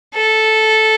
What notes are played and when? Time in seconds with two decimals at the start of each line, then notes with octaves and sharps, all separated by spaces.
0.14 A4